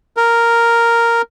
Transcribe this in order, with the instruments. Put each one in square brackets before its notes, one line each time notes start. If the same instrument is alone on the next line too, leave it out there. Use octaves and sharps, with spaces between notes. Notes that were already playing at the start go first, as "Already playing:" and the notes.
[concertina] A#4